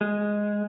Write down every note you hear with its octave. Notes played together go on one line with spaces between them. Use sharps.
G#3